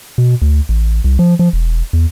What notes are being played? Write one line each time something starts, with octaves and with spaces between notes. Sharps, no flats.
B2
D2
A1
C2
F3
F3
E1
E2